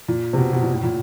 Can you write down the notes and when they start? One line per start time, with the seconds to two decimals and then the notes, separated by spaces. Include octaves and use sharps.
0.08 A#2
0.33 C3
0.38 B2
0.53 B2
0.63 A#2
0.74 A2
0.84 A#2